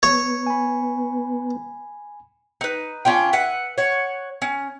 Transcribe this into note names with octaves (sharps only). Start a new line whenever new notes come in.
B3 C#5
G#5 B5
D#4 B4
C#4 D4 F4 G5
B4 E5 F#5
C#5 F#5
C#4